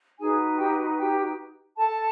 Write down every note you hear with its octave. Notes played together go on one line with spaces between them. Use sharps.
D#4 F#4 G#4 B4 G#5
G4 G5
G4 G5
A4 A5